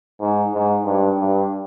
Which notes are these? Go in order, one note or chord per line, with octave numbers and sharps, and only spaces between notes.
G#2
G#2
G2
G2